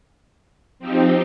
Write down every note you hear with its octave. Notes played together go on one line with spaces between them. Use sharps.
F3 C4 D#4 G4